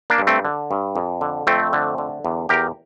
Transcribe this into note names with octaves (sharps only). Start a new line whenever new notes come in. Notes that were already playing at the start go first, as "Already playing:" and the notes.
A#3 D4
G2
A3 C4
D3
G2
F2
D3
F2 A3 C4
D3
D3
E2
E2 G4 A#4